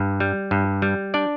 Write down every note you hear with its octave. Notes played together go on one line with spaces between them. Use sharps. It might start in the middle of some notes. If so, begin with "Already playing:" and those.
Already playing: G2
G3
G2
G3
D4 D5